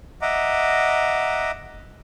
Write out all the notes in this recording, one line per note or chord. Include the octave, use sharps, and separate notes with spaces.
D#5 E5 F#5 A#5 D6